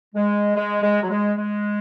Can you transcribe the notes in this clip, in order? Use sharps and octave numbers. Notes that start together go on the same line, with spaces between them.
G#3
G#3
G#3
F#3
G#3
G#3